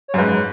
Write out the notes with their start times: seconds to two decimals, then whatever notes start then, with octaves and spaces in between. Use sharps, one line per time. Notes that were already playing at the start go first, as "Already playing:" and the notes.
0.08 C#5
0.14 F#2
0.18 G#2 B4